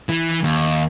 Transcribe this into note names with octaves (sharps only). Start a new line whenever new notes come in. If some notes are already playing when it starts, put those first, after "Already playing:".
E3
D#2